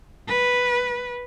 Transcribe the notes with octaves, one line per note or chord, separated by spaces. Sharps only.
B4